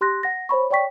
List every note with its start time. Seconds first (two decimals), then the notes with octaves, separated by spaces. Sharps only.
0.01 G4 C6 F#6 A#6
0.23 F#5 A#6
0.49 C5 C#5 B5 C#6
0.70 C#5 D5 G5 C#6 B6